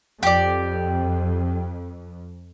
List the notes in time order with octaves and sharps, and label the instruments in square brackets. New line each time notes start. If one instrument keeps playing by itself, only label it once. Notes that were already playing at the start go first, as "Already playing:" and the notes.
[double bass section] F2 [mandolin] G4 D5